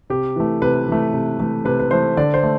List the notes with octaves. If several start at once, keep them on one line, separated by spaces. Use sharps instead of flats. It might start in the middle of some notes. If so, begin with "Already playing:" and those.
C3 G4
E3 A3
C3 B4
E3 A3
C3
E3 A3
C3 B4
B4
E3 A3 C5
D3 D5
C5
A3